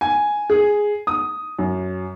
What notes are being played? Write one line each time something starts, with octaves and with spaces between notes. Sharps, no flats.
G#5
G#4
D#6
F#2